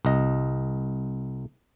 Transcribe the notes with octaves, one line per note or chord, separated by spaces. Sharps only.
C2 D#5